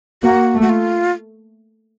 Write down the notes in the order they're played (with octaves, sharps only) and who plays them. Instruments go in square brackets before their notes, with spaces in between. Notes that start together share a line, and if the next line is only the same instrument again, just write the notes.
[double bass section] A#3 [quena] F#4
[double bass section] A3
[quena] F#4
F4